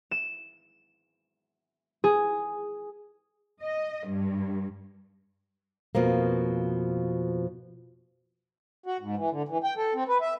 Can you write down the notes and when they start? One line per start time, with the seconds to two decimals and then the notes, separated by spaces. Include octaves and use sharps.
0.11 E7
2.04 G#4
3.61 D#5
4.08 G2
5.95 F2 B2 F3 A#3
8.86 F#4
9.00 G#2
9.17 E3
9.30 D3
9.49 E3
9.64 G5
9.77 A4
9.94 C4
10.08 B4
10.21 E5